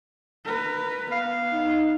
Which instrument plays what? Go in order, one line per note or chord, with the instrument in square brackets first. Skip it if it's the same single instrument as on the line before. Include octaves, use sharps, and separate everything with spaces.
[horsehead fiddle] A#4 B4
[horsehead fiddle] B3 [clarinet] F5
[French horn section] D#4